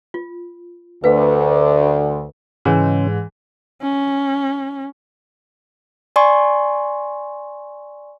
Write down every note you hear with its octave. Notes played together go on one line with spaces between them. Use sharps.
F4
D2 D3 B4 F5
G#2 C#3 E3 C#4
C#4
D5 G#5 C6 C#6